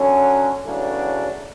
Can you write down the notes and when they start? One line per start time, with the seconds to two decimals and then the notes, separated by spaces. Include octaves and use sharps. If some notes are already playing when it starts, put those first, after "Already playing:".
Already playing: D3 F#3 C#4
0.64 E2 C#3 F#3 A3 D4